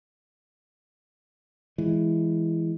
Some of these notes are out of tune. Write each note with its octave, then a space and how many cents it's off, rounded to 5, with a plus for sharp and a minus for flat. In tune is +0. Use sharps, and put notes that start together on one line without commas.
E3 +0 G#3 +0